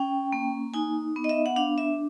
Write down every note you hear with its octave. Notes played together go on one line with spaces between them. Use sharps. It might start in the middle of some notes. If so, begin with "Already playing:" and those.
Already playing: C#4 G5
A#3
D#4 G#5
B3
D#5
E5
F#5
D4 F5
E5